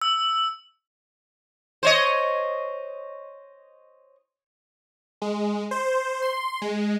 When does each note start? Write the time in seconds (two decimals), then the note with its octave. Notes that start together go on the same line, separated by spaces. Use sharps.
0.02 E6
1.83 C5 C#5 D#5
5.22 G#3
5.71 C5
6.22 C6
6.62 G#3